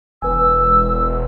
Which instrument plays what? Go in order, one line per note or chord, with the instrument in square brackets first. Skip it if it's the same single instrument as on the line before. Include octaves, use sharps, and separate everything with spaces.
[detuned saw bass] E1 [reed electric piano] B4 G#5 [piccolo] E6